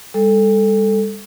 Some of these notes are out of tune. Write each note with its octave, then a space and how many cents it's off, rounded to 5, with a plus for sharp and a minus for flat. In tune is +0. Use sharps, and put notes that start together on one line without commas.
G3 +40 A4 +0